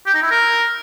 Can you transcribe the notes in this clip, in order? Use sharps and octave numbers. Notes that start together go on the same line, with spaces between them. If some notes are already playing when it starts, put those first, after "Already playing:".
G4
D#4
E4
A#4